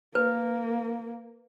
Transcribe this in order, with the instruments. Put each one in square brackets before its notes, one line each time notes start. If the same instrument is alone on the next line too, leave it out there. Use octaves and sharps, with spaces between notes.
[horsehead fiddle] A#3 [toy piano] B4